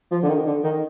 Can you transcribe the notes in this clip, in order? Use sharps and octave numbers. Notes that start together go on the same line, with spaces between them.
F3
D3
D#3
D3
D#3